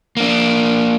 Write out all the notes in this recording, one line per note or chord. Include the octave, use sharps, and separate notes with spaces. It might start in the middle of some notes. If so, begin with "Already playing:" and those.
A#3 D4